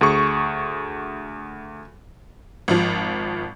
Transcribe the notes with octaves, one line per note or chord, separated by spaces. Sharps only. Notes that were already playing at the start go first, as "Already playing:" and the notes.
D2 G#4 C#6
G#1 F3